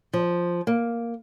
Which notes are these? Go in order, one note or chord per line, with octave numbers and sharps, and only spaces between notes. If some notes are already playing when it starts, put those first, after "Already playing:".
F3
A#3